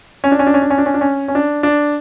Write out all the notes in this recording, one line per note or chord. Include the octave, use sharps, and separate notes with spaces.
C#4
D4
C#4
D4
C#4
D4
C#4
D4
C#4
D4
C#4
C#4
D4
D4